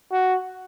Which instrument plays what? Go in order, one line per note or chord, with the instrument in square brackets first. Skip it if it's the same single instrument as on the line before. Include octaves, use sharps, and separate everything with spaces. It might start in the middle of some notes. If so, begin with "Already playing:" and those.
[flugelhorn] F#4